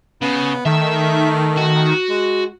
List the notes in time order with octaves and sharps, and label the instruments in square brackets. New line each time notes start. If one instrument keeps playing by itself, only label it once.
[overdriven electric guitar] C#3 [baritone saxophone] B3
[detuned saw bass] D#3 [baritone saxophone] A3 [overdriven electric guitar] E5
[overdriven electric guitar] F#4
[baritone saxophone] G#3